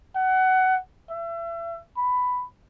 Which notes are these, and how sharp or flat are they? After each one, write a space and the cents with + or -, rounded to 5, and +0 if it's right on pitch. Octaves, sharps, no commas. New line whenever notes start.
F#5 +20
E5 +35
B5 +10